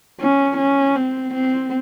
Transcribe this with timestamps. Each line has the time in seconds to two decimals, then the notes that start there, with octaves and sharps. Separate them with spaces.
0.20 C#4
0.57 C#4
0.96 C4
1.34 C4